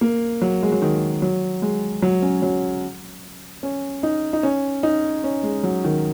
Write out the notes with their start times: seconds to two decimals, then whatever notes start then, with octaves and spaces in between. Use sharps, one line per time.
0.01 A#3
0.42 F#3
0.62 G#3
0.72 F#3
0.82 D#3
1.22 F#3
1.62 G#3
2.02 F#3
2.22 C#4
2.42 F#3
3.63 C#4
4.03 D#4
4.33 D#4
4.43 C#4
4.83 D#4
5.24 C#4
5.43 G#3
5.63 F#3
5.84 D#3